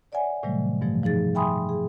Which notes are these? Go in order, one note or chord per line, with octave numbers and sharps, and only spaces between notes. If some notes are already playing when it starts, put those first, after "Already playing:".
C#5 D5 E5 F#5 G#5
A2 C3 D#3 F#3 G3 A3
G2 B2 E3 F3 A3
F3 D#4 G#4 A6
E5 G5 G#5 B5 C6 D#6
G#4